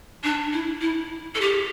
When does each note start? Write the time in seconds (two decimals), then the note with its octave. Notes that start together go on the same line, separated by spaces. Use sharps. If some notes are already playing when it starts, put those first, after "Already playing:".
0.23 D4
0.52 E4
0.81 E4
1.35 A4
1.40 G4